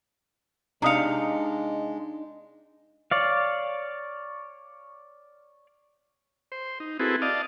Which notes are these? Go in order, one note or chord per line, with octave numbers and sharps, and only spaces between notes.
C3 G#3 D4 D#4 F5 A#5 D#6 C#7
C#5 D5 F5
C5
D#4
C4 E4 F#4 G#4 A4 B4
D5 D#5 F5 A5